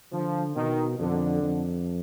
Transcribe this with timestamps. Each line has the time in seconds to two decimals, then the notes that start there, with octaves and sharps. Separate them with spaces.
0.13 D3 F3
0.56 B2 D#3
1.00 F2 D3
1.42 F2